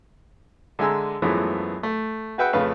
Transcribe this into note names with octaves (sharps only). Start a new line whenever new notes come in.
D3 G#3 E5 G#5 A#5 E6
F#2 E3 F3 G#3 A3 B3
A3
F#4 G#4 B4 E5 F#5 G5
F2 C#3 A3 B4 F5